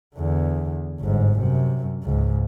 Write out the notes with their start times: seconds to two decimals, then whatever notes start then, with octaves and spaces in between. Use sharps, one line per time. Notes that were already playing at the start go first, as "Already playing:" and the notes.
0.15 E2 D3
1.00 G1 G#2
1.38 F#2 C3
2.03 C#2 G#2